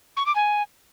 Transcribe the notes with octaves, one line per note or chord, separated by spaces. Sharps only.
C#6
D6
G#5